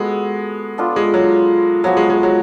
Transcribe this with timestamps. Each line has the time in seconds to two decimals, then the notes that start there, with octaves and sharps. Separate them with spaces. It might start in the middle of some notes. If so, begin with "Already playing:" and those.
Already playing: G#3 B3 F#4 A4
0.78 B3 D4 F4 A4
0.96 G#3
1.14 F#3
1.83 F3 F#3 B3 F#4 C#5
1.97 G#3
2.10 G#3
2.23 F#3